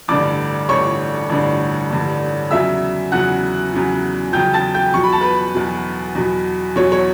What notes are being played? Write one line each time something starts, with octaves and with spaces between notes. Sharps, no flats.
A1 G2 D3 D5 D6
A1 G2 D3 C#5 C#6
A1 G2 D3
A1 G2 D3
E2 C#3 F#3 E5 E6
E2 C#3 F#3 F#5 F#6
E2 C#3 F#3
E2 C#3 F#3 G5 G6
A5 A6
G5 G6
E2 B2 F#3 C#6
B5
A5
B4 B5
E2 B2 F#3
E2 B2 F#3
E2 B2 F#3 C#5
C#5